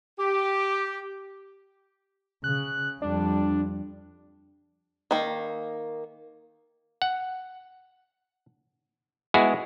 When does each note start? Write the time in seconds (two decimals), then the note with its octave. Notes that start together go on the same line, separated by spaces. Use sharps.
0.19 G4 D6
2.44 C#3 F#6
3.02 F2 G3 D4
5.11 D#3 A#3
7.02 F#5
9.34 G#3 B3 E4 F#4 G#4